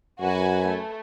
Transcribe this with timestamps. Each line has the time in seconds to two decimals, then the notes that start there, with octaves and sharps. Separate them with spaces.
0.21 F#2 F#4 B4 G#5
0.68 A3